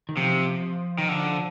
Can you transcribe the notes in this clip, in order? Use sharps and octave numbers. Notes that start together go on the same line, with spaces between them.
D#3
C3 F3
D#3
D3